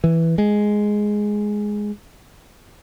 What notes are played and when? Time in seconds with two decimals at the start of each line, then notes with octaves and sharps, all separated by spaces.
0.04 E3
0.38 G#3